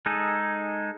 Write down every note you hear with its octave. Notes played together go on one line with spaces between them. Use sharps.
G#3 D#4 G#4 A4